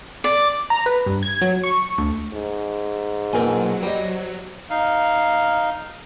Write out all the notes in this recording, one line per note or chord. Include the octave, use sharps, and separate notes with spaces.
D5
A#5
B4
G2
G#6
F#3
C#6
D2
G#2
A#1 B2 F#3 C4 A#4 G#5
G3 C5 D#5
D#4 F5